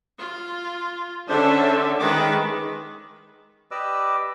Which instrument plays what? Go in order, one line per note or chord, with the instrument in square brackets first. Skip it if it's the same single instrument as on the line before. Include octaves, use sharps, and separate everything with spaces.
[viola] F4
[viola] D3 [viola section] C#4 A4 E5 [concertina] D4 C5
[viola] D#3 B4 [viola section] G#3 [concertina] D6
[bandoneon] G4 B4 D5 D#5 D6 E6